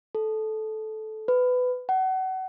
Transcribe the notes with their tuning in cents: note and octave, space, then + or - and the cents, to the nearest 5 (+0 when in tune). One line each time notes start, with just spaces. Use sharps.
A4 -15
B4 +20
F#5 +30